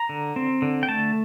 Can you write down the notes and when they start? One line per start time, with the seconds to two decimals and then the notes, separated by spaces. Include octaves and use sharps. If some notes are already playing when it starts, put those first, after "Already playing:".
Already playing: A#5
0.09 D3
0.36 C4
0.62 D3
0.83 G5
0.89 A3 A5